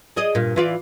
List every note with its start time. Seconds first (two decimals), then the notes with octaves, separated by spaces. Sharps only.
0.16 G#4 D5 D#5
0.35 G2 A#2
0.56 E3 F4 D5